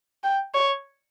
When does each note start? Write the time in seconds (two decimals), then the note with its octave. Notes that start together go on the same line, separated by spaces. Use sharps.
0.23 G5
0.54 C#5